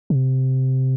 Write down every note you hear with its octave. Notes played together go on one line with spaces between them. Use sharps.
C#3
C3